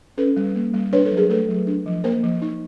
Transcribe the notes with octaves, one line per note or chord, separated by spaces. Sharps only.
C#4 A4 B4
G3
A#3
G3
D4 B4 C#5
A4 B4
F#3
G#4 A#4
A3 A4 B4
F#3
D4
F3
A#3 A#4 C5
F3
D#4